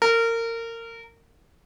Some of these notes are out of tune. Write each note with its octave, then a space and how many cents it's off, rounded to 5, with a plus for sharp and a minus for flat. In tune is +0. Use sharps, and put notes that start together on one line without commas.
A#4 -25